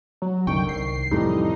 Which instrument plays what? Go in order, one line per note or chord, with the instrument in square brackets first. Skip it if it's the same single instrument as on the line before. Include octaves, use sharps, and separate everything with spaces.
[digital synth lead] F#3
[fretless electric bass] C2 F#2 D3 [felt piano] D#3 C#6 [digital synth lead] G5
[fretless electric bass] C2 [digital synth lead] C7
[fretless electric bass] F2 A2 C3 [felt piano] E3 G3 A3 [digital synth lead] D#4